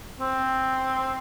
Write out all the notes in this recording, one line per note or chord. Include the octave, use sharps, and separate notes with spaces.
C4